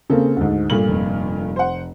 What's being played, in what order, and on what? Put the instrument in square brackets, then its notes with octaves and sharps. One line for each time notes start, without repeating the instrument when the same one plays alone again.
[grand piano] C#3 A#3 C4 [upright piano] A4
[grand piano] D2 G#2
[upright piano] G2 A#2 A3 [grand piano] F#7
[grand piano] F1
[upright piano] C5 F#5